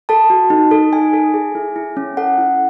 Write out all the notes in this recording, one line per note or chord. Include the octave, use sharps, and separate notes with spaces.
A4 A5
F#4
D#4
A4
D#4 G#5
A4
G#4
E4
E4
C#4
A4 F#5
E4